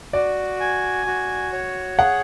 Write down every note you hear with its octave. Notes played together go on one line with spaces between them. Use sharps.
F#4 D5
G#5
F#4
C#5
G#4 F#5